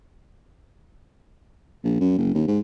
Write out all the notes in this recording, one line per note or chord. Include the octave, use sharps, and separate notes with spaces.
A#1
F#2
F#1
D#2
G#2